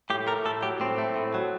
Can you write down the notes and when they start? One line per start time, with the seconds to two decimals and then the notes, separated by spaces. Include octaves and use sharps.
0.10 A2 G4
0.27 A3 A#4
0.45 A2 A4
0.62 F#3 G4
0.80 A2 C4
0.98 A3
1.16 A2
1.34 F#3